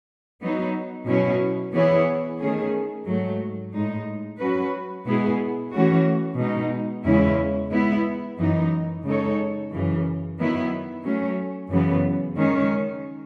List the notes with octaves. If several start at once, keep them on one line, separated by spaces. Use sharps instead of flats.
F#3 B3 D#4
B2 F#3 C#4 E4
E3 B3 E4 G#4 C#5
D#3 A3 C#4 G#4
G#2 F#3 A3
A2 G#3 D#4
F#3 C#4 F#4 B4
B2 G#3 B3 E4 G#4
E3 A3 C#4 F#4
B2 G#3 D#4
E2 C#3 G#3 C#4 E4
G#3 B3 E4
F#2 E3 B3 D#4
C#3 G#3 D#4 A4 C#5
F#2 C#3 E3
D#3 F#3 B3 E4
F#3 A3 C#4
F#2 C#3 E3 B3
D#3 G#3 C#4